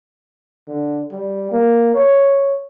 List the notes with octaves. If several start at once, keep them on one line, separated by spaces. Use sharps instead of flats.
D3
G3
A#3
C#5